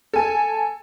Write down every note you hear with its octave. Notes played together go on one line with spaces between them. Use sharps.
A4 G#5